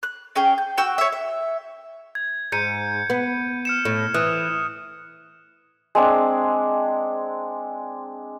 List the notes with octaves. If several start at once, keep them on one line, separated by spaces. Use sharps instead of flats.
F#6
C#4 G#4 G5
G6
F#4 G5 E6 G6
C#5 E5
E5
G#6
G#2 G6 C#7 D#7
B3
F6 C#7 E7
A2
E3 D#6 F#6
G#3 C4 D4